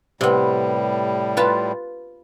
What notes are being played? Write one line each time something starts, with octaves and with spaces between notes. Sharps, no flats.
A2 C3 G3 B3
F4 B4 A5